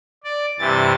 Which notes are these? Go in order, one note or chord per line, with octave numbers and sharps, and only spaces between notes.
D5
G2 C3 E3 A6